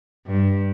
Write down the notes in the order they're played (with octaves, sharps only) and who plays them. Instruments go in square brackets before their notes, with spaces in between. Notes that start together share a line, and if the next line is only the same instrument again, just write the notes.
[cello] G2